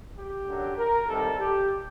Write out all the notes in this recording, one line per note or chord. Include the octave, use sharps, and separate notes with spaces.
G4
F#2 D3 F#3
A#4
C2 C3 D#3 G3 A4
G4